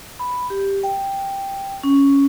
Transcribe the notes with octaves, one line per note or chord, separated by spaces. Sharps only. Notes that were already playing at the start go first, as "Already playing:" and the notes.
B5
G4
G5
C#4